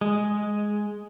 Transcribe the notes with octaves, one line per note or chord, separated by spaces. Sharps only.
G#3